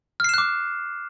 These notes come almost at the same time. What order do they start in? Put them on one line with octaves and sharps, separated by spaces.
F6 C7 E7 F#6 D6